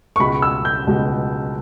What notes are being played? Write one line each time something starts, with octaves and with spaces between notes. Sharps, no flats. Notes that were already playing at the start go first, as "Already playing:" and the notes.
C#6
C#2 B2 G#3 B5
E6
G6
C#2 B2 G#3